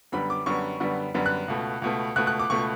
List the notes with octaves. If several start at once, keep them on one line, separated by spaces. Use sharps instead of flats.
F#2 D3 G3 B3 B5
D6
F#2 D3 G3 B3 C#6
F#2 D3 G3 B3
F#2 D3 G3 B3
F#6
C#2 B2 A3
C#2 B2 A3
C#2 B2 A3 F#6
F#6
D6
C#2 B2 A3 C#6